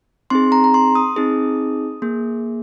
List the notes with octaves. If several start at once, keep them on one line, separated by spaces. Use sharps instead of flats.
C4 D#4 G#4 C6
A#5
A#5
C6
D#6
C4 D#4 G#4
A#3 G#4